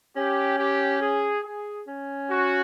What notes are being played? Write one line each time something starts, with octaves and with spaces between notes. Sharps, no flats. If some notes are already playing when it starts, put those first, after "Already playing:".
C#4 G4
G4
G#4
G#4
C#4
F#4